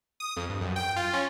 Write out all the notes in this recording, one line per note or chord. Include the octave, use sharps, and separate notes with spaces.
D#6
F2
G2
F#2
G5
F4
C#4